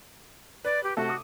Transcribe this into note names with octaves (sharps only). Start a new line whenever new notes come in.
B4 D5
G4
C3 A3 F#4 A4
D6 D#6